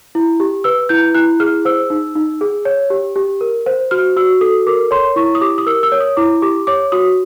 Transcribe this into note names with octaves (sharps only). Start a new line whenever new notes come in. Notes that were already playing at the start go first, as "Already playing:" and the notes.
E4
G4
B4 E6
E4 G6
E4 F#6
G#4 F6
C5 E6
D#4
D#4
G#4
C#5
G4
G4
A#4
C5
F#4 F6
F#4 E6
A4 D#6
A#4 D6
C#5 C6
E4 C#6
D#6
G4 D6
D#6
A#4 E6
E6
C#5
D#6
E4 D6
G4 D6
C#5 D6
F#4 D#6